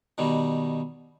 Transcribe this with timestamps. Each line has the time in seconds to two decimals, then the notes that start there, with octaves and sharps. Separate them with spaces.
0.18 B2 D#3 G3